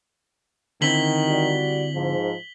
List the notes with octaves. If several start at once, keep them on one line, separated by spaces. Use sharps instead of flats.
D3 D#3 C4 E4 B6 F#7 G7
G3 F#4 D5
G#2 F3